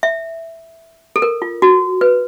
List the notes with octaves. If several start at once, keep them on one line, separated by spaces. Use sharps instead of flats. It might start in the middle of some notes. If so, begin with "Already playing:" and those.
E5
A4
A#4
F4
F#4
B4